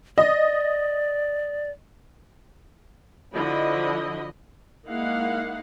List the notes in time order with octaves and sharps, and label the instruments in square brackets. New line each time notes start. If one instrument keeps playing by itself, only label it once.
[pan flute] D5 [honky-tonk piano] D#5
[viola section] D3 F3 E4 F#4 D#5 B5
G#3 A#3 D#4 E4 F5 F#5